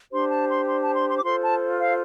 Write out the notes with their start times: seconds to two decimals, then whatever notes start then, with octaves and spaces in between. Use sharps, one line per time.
0.12 D4 G4 C5 C6
0.30 A5
0.49 C6
0.67 C6
0.82 A5
0.96 C6
1.10 C6
1.17 D6
1.23 F4 A4 C5 C6
1.42 A5
1.79 F5